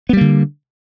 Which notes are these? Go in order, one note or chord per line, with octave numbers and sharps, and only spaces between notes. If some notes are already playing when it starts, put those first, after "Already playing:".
D3 G3 A#3 B3